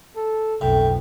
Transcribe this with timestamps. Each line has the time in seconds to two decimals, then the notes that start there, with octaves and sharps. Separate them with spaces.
0.16 A4
0.61 B1 F2 A2 G5